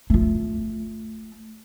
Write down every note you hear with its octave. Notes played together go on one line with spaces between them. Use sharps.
A3 F4